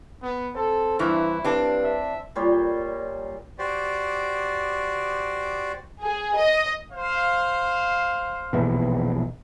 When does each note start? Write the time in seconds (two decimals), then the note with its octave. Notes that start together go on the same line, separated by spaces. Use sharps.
0.22 B3
0.55 C4 A4
0.99 G2 E3 E4
1.45 G2 C4 D4
1.83 E5
2.35 A#2 G3 C5 C#5
3.59 F#4 G4 C5 D5
6.02 G#4
6.36 D#5
6.92 C5 F5
8.53 A#1 E2 B2